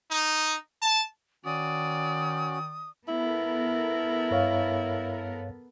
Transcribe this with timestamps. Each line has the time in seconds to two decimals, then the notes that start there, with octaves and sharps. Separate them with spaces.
0.11 D#4
0.82 A5
1.45 D#3 C#4 F#4 D5 D#6
3.08 B3 E4 A4 A#4
4.31 G2 C#5 F5